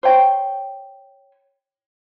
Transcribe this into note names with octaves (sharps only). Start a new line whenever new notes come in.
C5 C#5 G5